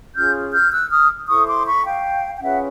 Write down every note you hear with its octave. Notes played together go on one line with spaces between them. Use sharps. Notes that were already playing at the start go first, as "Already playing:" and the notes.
C#4 F4 G#4 F6 G6
F6 G6
E6 F#6
D#6 F6
E4 A4 C5 C#6 D#6
C6 D6
B5 C#6
F5 G5
G5
C#4 F4 G#4 B4 E5 F#5